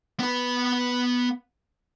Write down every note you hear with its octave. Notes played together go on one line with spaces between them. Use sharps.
B3 B4